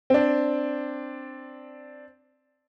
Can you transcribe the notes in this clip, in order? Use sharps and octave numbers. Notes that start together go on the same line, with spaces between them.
C4 D4